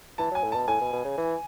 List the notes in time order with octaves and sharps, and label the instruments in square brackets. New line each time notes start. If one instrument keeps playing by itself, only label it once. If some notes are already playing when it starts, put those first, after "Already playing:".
[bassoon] E3 [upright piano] A5
[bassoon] F#3 [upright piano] G#5
[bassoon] A2
[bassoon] B2 [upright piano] A5
[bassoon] A2 [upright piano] G#5
[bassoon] B2
B2
C#3
E3